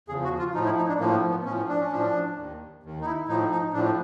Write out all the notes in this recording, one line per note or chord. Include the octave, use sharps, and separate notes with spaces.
E2 C#3 F3 G#4
F#4
F4
A2 F3 D#4
E4
D#4
D4
A2 F3 A#3
B3
A2 F3 C#4
D4
C#4
A2 F3 D4
D#2 D#3
D#2 D#3
D#4
E4
A2 F3 D#4
D#4
A2 F3 D4